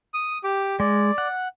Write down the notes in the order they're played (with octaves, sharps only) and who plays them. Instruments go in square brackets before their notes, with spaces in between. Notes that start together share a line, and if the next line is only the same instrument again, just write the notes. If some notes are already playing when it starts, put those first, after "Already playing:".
[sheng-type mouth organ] D#6
G4 D6
[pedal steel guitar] G#3 [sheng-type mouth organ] D5
[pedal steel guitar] F#5